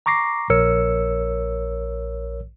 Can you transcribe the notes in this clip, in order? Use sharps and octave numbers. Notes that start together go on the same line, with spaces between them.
A#5 C#6 D6 A#6 C7
A#1 A#4 C#5 E6 C#7